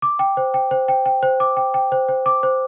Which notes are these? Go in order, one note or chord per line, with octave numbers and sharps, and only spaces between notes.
D6
G5
C5
G5
C5
G5
G5
C5
D6
G5
G5
C5
C5
D6
C5